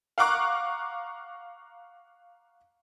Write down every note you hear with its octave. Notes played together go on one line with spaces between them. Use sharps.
F5 F#5 A#5 C#6 D6 F#6